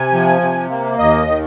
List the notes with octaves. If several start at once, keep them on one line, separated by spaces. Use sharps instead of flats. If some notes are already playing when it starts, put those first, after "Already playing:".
Already playing: C3 G#5
F3
C3
A#3
D#2 D#5
D#3